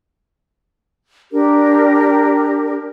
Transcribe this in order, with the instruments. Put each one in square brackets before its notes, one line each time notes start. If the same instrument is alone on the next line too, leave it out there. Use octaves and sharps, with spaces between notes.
[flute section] D4 G4 A#4